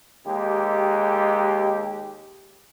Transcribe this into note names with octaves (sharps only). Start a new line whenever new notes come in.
D#2 G#3 G4